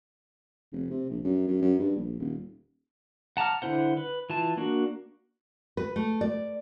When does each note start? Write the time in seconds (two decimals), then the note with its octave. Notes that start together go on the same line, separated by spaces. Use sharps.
0.72 F1
0.90 C3
1.10 A#1
1.24 F#2
1.48 F#2
1.62 F#2
1.79 G2
1.96 A#1
2.19 D#1
3.37 F#5 A5 A#5 D6 F6
3.62 D3 E4 C5 F#5
3.97 B4
4.30 E3 F4 A5
4.57 A#3 D4 F#4
5.77 B4
5.96 A3
6.21 D5